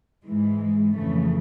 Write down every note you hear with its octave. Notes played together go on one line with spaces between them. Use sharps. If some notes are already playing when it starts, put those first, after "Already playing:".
G#2 E3 G#3
F2 C#3 E3 A3